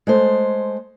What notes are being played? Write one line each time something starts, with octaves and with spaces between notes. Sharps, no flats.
G#3 A3 C5